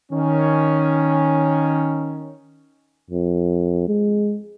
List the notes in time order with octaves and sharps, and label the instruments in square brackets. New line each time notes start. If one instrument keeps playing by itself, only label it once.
[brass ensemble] D#3 C#4
[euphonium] F2
G#3